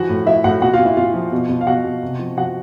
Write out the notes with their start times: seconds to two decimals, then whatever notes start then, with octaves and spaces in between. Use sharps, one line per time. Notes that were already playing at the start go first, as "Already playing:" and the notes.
Already playing: E3 F3 F#4 F#5
0.09 A2
0.26 F3 E4 E5
0.44 A2 F#4 F#5
0.62 A#2 F#4 F#5
0.74 F4 F5
0.79 A#2
0.85 E4 E5
0.97 A#2 F4 F5
1.14 F3
1.32 B2
1.49 B2
1.61 F5
1.66 B2 F#4 F#5
1.84 B2
2.03 C3
2.19 F3
2.37 F3 F#4 F#5